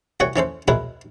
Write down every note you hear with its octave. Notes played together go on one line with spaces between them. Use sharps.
C2 E3 F#4 C#5 C#6
E3 C#4 A4 C5
B2 F#3 G#3 E4 A#4 B4